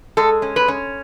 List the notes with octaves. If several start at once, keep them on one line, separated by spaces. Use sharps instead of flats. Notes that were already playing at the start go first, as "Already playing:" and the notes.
G#3 A4
C#4
B4
C#4